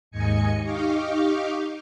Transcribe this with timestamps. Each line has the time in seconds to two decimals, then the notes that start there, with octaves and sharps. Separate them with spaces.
0.11 D#2 G#2 D#5 G#5 C#7
0.63 D#4 G4 D#5 F5 C#6 D6